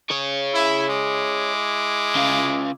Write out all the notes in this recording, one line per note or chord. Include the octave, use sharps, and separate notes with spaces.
G#4 C#5
E4
G#3 E4 D6
C#3 F4